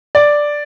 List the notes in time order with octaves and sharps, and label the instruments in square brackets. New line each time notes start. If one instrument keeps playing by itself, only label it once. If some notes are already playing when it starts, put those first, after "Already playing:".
[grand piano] D5